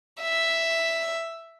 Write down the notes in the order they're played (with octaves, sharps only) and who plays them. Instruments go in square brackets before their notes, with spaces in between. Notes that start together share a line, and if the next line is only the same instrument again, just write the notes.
[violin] E5